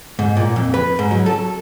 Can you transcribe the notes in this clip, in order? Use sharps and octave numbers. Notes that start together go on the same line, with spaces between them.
G#2
A#2
F2
B4
G#2
F#3
A4